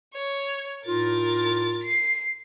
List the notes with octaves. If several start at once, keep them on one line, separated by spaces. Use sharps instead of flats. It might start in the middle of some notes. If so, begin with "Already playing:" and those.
C#5
A2 D#4 F4 A#4 A6
C7